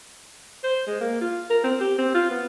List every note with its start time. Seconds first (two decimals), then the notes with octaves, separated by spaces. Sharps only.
0.63 C5
0.87 G#3
1.01 A#3
1.21 F4
1.50 A#4
1.64 C4
1.80 G4
1.98 C4
2.14 F4
2.31 B3